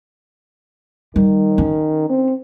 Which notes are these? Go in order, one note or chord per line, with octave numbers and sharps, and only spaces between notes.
D#3 G3
C#4
C4